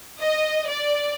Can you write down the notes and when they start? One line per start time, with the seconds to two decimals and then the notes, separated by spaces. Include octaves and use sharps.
0.20 D#5
0.69 D5